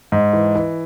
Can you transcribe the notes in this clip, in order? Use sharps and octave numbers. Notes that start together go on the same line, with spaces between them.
G#2
E3
E3